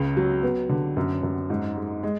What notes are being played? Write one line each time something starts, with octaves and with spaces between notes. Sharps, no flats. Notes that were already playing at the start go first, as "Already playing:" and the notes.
Already playing: C#2 C#3
F#3
B3
D3
F#2
F#2
G#2
G#3
G#3